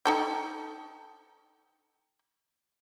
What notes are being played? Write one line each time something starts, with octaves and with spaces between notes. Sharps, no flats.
D#4 A4 G5